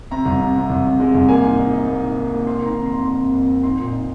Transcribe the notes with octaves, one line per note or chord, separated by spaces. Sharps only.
C3 A#5
C2
C3
C3
C2
C3
G#3
C2
A#3 G#5
G#2
D#4
D#4
A#3
D#4
A#3
A#3
C4 C6
D#3 A#5
C3
F2 C6
F2 C6
C3
F2
C4
D#4 C6
A#2
D#4